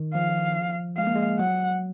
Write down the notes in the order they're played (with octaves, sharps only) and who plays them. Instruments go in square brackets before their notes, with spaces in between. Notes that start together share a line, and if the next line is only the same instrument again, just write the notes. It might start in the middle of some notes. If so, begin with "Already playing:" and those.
Already playing: [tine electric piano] D#3
[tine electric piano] F3 [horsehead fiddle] F5
[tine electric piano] G#3 [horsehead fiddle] F5
[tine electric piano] A#3
G#3
[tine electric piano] F#3 [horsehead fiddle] F#5